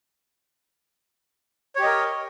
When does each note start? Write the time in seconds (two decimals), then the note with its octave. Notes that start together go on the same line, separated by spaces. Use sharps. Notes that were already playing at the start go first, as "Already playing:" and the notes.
1.76 C#5
1.79 G4
1.83 D#5
1.86 A#4